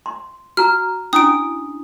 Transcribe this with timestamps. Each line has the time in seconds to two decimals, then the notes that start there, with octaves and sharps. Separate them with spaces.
0.06 C6
0.57 F#4 A#5 F6
1.13 C#4 D4 E4 D#6 D7